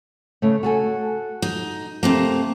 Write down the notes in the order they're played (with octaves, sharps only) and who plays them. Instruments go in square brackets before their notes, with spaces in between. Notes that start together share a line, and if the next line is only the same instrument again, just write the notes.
[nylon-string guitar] C#3 A3
F#4 A4 G#5
[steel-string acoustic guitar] D#4
C3 A3 A#3